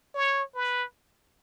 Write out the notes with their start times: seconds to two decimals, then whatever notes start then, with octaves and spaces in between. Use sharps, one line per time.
0.15 C#5
0.55 B4